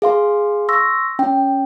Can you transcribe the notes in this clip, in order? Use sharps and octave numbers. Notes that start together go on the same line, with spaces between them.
G#4 F5 C6
C6 C#6 E6 A#6
C#4 G5